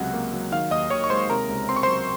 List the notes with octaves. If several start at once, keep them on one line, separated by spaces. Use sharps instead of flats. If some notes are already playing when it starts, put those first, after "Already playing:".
Already playing: C#2 C3 F#3 F#5
A#3
F#3
D#3 F5 F6
D#2 D#5 D#6
D#2 C#5 C#6
C#6
G#3 C5 C6
C3 A#4 A#5
C#2
C4 C6
C#6
F#3 C5 C6